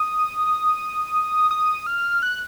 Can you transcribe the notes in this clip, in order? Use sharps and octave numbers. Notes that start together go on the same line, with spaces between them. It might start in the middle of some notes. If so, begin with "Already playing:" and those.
Already playing: D#6
D#6
F6
F#6